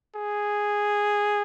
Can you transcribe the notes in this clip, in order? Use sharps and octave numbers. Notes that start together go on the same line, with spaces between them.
G#4